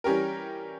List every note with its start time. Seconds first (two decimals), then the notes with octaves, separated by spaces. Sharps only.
0.04 E3 G3 C#4 G4 A#4